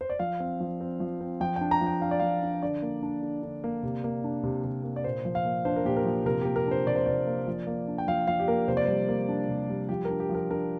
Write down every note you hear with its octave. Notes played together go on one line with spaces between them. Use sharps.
C5
D5
F3 F5
C4
F3
C4
F3
C4
F3 G5
D4 G5
A#5
F3
G5
D4 F5
D5
F3 F5
D4
D3 D5
A#3
D4
D3
D3
A#3
C3
A#3
D4
C3
C3
A#3
D5
A#2 C5
F3
F5
A#3
D4 C5
A#4
A#2 G4
A#4
F3
C3 A#4
A#3 G4
A#4
D4 C5
C3 D5
C5
C3 D5
A#3
F3
A#3
D4
G5
F3 F5
F3 F5
G4
A#3 A#4
C3 C5
D5
G3 C5
A#3
D4
C3
G3
F3 G4
A#4
D4
G4
F3
A#4
D4 A#4